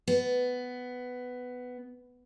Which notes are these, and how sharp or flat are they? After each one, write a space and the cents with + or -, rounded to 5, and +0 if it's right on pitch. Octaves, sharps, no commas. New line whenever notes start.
B3 +10